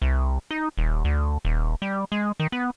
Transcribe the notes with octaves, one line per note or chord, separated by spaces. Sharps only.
C2
D#4
D#1
D2
D#1
G3
G#3
D#3
B3